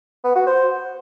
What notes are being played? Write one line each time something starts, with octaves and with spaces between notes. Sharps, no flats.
B3
F#4
C5